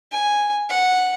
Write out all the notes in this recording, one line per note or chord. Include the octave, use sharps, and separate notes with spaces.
G#5
F#5